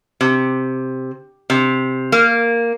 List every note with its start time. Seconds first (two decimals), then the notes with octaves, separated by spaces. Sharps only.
0.21 C3
1.50 C3
2.12 A#3